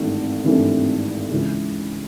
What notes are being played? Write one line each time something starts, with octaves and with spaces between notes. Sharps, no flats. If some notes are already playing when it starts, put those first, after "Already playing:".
Already playing: G#1 G2 E3 A3 C4
G#1 G2 E3 A3 C4
C#2 C#3 E3